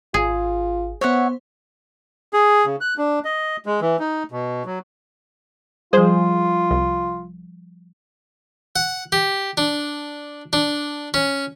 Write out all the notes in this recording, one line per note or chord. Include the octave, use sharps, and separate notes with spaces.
G#1 F4 G#4
B3 C5 C#5 E5 F#5
G#4
C#3
F#6
D4
D#5
G#3
E3
D#4
B2
F#3
F3 G3 F4 G#4 C5
C2
F#5
G4
D4
D4
C#4